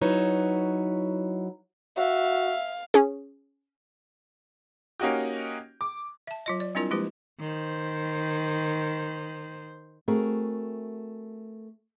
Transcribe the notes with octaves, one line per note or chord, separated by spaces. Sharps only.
F#3 D#4 E4 B4 C#5
F#4 E5 F5
C#4 G#4
A#3 C#4 D#4 F#4 G4
D6
E5 A5
F#3 F4 D#5
D5
G3 C4 D4 E4 F4 A#4
F3 G#3 A#3 E4 G4 B4
D#3 C5
A3 C4 F#4 G#4 A#4